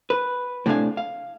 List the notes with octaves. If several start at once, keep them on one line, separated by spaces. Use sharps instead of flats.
B4
A2 C3 A3 D4 F5 G#5
F5